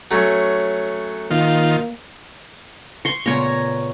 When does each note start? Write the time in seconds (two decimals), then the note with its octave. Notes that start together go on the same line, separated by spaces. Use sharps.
0.11 F#3 A3 C#4
1.31 D#3 A#3 F4
3.05 C6 C#6
3.26 A#2 C#3 B3 C#5 A#5